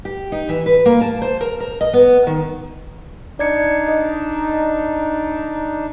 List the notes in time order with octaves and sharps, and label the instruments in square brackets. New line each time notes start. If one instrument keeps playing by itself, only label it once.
[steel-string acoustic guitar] G4
D#4
E3
B4
A#3
A5
C5
A#4
A#4
D#5
B3
D#3
[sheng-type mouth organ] D4 D#4 [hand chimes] D5 G#6 C#7
[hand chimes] D#5